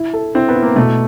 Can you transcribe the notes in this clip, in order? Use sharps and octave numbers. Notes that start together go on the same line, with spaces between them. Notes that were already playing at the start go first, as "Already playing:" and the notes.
Already playing: E4
A4
C4 E4
B3
E4
A#3
B2 A3